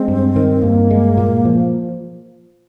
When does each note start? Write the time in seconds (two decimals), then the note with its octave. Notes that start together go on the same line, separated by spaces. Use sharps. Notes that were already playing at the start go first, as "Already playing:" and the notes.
Already playing: G#3 C4
0.08 G2
0.36 D#3
0.62 G2 A#3
0.91 G#3
1.17 A#2
1.45 F3